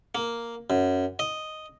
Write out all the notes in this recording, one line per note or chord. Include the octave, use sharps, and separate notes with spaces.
A#3
F#2
D#5